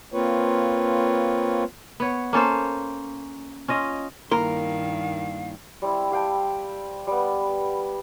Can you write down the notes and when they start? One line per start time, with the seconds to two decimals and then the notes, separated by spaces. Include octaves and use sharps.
0.13 A#3 C4 F4 B4 C#5
2.00 B3 C#5
2.33 A#3 C#4 A4 C5
3.68 C#4 F4 D#5
4.31 G2 D#3 A#3 E4 A#4 F5 C6
5.82 G3 C4 E4
6.11 G4 F5 G5 A5
7.07 G3 B3